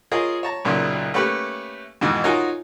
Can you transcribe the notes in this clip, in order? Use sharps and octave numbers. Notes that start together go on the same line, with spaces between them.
F4 G#4 A#4 C#5 D#5
C#5 A5 A#5
B1 F#2 A#2 C#3
A3 A#3 C#4 G4 B4 B5
F2 G#2 B2 D#3 E3
D#4 F4 F#4 A#4 C#5 G#5